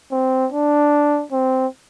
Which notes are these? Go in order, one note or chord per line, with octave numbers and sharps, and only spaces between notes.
C4
D4
C4